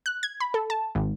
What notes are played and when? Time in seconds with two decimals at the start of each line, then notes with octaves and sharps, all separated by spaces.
0.06 F#6
0.23 G#6
0.40 B5
0.54 A4
0.70 A5
0.95 G#1